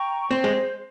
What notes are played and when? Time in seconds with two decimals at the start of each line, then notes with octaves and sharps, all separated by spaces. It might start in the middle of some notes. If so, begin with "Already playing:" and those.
Already playing: G5 A#5 C#6
0.31 C4 C5
0.44 G#3